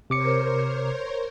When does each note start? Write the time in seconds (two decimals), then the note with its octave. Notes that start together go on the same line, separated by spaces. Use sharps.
0.10 C3 A#4 C5 C#5 D6 C#7